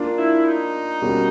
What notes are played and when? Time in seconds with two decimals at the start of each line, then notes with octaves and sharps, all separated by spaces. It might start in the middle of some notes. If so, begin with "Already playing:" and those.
Already playing: A#3 D4 F4
0.17 E4
0.46 D#4
1.02 B2 G3 A#3 C#4 F#4